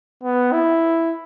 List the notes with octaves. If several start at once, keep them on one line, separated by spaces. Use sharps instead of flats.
B3
E4